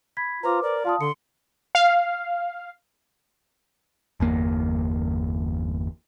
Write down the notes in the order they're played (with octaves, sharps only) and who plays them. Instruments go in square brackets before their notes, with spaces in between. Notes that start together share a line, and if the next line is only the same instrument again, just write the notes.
[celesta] B5 G#6 B6
[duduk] F4 [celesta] B4 C5 D6 [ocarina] A#5
[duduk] A#4 [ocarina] D5
[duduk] F4 [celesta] F5 A5 D#6
[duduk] D3 [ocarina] C6 [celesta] C#7
[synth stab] F5
[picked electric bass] G1 E2 A#3